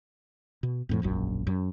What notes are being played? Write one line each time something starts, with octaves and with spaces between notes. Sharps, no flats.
B2
F2 A2 F3
E1 A#1 F#2
F#2